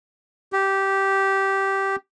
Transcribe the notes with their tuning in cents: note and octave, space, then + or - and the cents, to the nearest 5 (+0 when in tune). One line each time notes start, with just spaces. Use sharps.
G4 -10